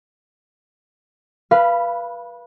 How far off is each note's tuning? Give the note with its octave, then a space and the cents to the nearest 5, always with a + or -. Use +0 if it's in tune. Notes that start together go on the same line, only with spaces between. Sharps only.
B4 -25 F5 -20 B5 +0